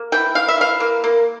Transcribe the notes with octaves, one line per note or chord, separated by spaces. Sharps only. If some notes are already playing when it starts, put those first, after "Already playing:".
Already playing: A#3
E3 G5
E3 F5
E5
E3 F5
A#3
A#3